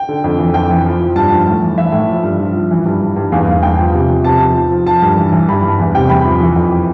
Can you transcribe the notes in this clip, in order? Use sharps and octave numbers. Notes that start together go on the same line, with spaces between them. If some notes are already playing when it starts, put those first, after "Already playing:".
Already playing: G5
D3
F2
E3
F2 G5
E3
F3
F3
G2 A5
F3
A2
E3
E3 E5
A2
F3
G2
F3
F3
E3
G2
G2
G2
E2 F5
E2 F5
E2 G5
F3
C3
F3
C3 A5
F3
F3
F3
F3 A5
G2
E3
E3
G2 B5
G2
E2
C3 G5
E2 B5
F3
E3
F2